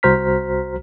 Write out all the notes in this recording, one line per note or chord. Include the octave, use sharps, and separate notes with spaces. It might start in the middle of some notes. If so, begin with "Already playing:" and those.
C2 F#4 C5 A#5 F6 B6